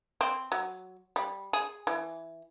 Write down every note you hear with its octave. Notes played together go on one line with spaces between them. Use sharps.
C4
F#3
G3
G#4
E3